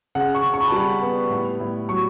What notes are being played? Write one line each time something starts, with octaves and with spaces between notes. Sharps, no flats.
C#3 F#5
C#6
C#3
C#6
B5
A5
G3 B5
B3
A2
A2
F#3 C#6